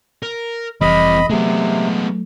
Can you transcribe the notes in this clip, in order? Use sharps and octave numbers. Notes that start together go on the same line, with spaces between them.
A#4
F1 E3 G3 C4 D#5 B5
C3 F#3 G#3 A3 B3